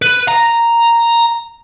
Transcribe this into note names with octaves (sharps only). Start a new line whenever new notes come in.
B4
A#5